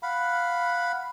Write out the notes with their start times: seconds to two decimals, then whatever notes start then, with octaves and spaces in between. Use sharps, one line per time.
0.03 F5 F#5 B5